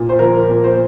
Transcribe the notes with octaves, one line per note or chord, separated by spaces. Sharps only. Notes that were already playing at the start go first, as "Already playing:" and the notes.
Already playing: A#2
C5
F3 A#4
A#2
C5